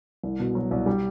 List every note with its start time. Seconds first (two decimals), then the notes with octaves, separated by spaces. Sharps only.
0.24 C2
0.40 B2
0.55 F#3
0.71 C2
0.86 G3